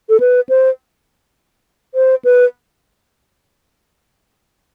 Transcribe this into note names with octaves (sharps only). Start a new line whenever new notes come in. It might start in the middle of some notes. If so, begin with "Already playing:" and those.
A4
B4
C5
C5
B4